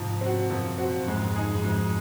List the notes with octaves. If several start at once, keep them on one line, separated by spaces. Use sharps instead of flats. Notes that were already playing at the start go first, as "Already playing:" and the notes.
Already playing: G#2 C3 F3
C4 F#4
F#2 A#2 F3
C4 F#4
F#2
F2 G#2 G#3
D#4 G#4
F#2
F2 G#2 G#3